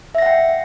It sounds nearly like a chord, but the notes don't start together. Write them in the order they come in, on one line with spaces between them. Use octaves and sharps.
E5 A#6 F#5 G5